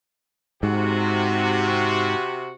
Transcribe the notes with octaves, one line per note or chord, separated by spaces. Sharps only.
G#2 C3 F#4